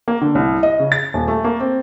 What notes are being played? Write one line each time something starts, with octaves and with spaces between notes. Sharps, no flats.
A#3
D3
C2
D#5
C#3
A6
D#1
A3
A#3
C4